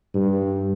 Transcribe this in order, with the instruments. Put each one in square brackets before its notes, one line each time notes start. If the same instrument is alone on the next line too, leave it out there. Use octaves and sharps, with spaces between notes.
[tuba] G2